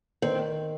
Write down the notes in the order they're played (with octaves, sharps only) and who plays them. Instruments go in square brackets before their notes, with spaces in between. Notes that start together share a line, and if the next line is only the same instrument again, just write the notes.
[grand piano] D#3 [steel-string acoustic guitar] C4